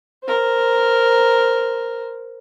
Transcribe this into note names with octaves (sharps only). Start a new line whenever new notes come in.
A#4 C5